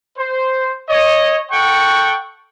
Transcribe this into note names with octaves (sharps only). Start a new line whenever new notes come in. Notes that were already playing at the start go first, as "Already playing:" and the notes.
C5
C#5 D#5
A4 F#5 G5 C#6